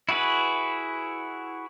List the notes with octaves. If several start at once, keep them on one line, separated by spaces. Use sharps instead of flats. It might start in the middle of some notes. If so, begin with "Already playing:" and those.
E4 F#4 G#4 B4